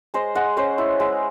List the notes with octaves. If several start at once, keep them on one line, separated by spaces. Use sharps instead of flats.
G#3 C5 D#5
G#3 D#5 F#5
C#4 C5 D#5
E4
G#3